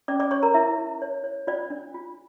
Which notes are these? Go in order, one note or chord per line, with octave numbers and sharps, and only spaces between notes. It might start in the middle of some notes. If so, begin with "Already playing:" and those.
C#4 D5 D6
D5 D6
C#5 C#6
A#4 A#5
E4 A#4 E5
E4
C#5
C#5
F4 D5
D4
F4